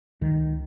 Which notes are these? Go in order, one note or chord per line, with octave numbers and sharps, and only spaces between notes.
C#2 D#3